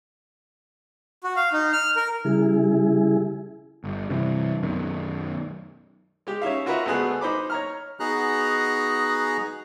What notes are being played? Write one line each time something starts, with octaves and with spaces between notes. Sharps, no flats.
F#4
F5
D#4
F6
A#4
C#3 G3 E4 G#4
G1
G2 C3 E3
B1 F#2 D#3
G#3 G4
C#4 D#4 E5 F5
F4 F#4 A#4 B4 D#5 E5
D2 G#3 A3 B3 G#4 F#6
D#4 C5 B5 D6
C#5 A#5 F6
B3 D#4 F#4 G#4 A#5 F#6